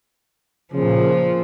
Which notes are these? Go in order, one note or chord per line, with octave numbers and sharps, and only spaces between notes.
A#2 C#3 F3 A#3